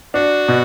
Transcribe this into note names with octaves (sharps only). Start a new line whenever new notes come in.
D4 F#4
B2